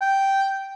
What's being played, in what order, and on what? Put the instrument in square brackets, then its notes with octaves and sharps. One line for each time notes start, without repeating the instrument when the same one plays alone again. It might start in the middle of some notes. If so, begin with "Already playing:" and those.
[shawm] G5